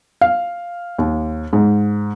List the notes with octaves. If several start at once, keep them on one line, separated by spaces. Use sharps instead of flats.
F5
D#2
G#2